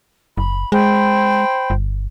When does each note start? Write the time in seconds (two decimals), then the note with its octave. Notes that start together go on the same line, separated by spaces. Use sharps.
0.37 F#1 B5
0.72 G#3 C5 G5 B5
1.70 G1